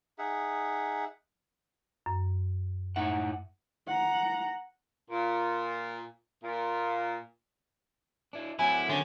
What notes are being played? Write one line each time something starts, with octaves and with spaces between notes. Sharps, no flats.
D#4 G#4 E5 F#5
F#2
A2 D#4 E5 F#5
F#5 A#5
A#2
A#2
D4 E4
F#3 C4 E4 F#5 G#5
D3 C#4